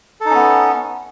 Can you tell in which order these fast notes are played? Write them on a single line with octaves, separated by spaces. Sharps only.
A4 D#4 C#4 B3